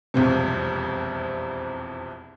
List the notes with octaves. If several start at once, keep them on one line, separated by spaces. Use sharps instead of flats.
E1 C2 F2 C3